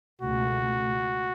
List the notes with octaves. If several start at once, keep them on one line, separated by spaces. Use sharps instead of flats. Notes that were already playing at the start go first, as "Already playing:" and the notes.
C#2 B2 A3 F#4